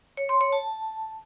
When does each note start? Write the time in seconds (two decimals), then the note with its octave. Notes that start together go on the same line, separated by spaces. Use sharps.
0.17 C#5
0.29 C6
0.41 C#5
0.52 A5